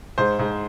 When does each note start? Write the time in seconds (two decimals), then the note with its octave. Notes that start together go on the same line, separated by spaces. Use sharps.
0.18 G#2 C5
0.39 G#2